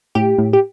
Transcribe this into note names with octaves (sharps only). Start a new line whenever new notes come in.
A2 G4
A2
G4